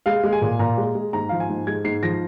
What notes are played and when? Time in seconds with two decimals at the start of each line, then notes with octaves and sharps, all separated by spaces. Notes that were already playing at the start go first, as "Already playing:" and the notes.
0.06 G#3 F5
0.23 G#3
0.33 G#5
0.41 A#2
0.59 A#2 A#5
0.78 G#3
0.95 G#3
1.13 G#2 A#5
1.29 F3 F5
1.40 G#5
1.49 G#2
1.67 G#3 G#6
1.84 G#2 C7
2.03 F3 A#6